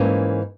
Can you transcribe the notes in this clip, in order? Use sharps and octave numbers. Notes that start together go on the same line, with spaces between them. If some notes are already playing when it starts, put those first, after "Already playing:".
Already playing: G#2 E3 A#3 C#4